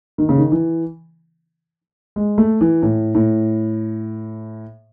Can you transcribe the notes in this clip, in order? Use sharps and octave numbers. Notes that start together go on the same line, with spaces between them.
D#3
C#3
D#3
E3
G#3
A3
E3
A2
A2